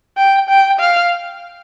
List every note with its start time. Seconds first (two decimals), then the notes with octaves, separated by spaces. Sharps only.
0.17 G5
0.49 G5
0.79 F5